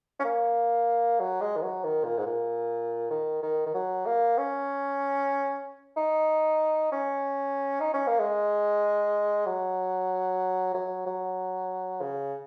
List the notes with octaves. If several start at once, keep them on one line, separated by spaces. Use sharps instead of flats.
C#4
A#3
F#3
G#3
D#3
F#3
D#3
A#2
G#2
A#2
D#3
D#3
D#3
F#3
A#3
C#4
D#4
C#4
D#4
C#4
A#3
G#3
F#3
F#3
F#3
C#3